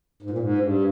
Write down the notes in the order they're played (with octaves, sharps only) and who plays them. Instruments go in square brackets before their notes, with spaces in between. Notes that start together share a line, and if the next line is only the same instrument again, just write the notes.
[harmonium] G#2
A#2
G#2
G2